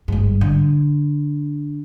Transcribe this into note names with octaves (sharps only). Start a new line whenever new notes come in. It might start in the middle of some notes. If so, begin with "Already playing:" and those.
G1 G#2
D3